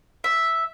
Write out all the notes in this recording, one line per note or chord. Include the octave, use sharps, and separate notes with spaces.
E5